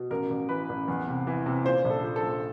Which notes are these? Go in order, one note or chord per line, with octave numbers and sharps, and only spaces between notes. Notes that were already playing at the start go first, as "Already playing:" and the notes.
Already playing: B2
A1 A#4
A1
E3 B4
A1
E2
C3
E3
C3
A#2 C5
A#1
A4
F3
A4
A#1